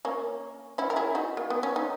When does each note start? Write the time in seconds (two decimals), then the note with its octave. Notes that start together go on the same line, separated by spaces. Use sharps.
0.05 A#3 C#4
0.78 C#4 E4
0.90 A#4
0.96 E4 G#4
1.15 D#4 F#4
1.37 A#3
1.50 B3
1.63 C#4
1.76 D#4